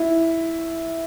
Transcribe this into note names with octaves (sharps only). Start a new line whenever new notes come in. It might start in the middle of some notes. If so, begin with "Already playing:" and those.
Already playing: E4